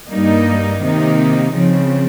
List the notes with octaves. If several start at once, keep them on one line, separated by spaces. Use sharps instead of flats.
G2 G3 A#3 D#4
C3 D#3 A#3 D#4
C#3 F3 C4